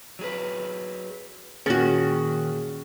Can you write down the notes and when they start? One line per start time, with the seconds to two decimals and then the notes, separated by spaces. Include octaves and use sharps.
0.19 F#3 G#4 B4
1.66 A#2 D#3 C#4 F#4 G#4 A#4 A6 F#7